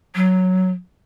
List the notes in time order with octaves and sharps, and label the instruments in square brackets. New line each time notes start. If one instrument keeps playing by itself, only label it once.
[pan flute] F#3